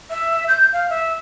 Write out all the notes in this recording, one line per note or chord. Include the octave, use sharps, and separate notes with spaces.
E5
G6
F5
E5